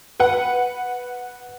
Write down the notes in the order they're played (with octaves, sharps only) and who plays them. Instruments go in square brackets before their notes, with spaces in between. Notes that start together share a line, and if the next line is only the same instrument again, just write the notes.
[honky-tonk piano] B4 F#5